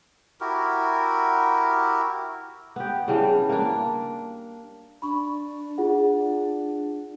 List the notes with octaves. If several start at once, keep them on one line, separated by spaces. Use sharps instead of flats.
E4 F#4 G4 A#4
B3 G4
C#3 E3 G3 D4
A#3 D4
D4 B5 C#6
F4 G#4 F#5